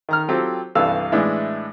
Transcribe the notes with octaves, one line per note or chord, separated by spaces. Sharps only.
D#3 A#5 F6
F#3 C4 F4 G4 A4
C2 G2 E3 A4 F5 E6
A2 E3 G#3 D4 E4